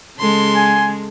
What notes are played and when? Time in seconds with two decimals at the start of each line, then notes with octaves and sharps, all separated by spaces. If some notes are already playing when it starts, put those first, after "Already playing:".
0.19 C#3 G#3 A4 C6
0.56 G#5